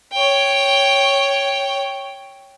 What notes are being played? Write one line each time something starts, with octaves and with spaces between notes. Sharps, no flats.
C#5 G5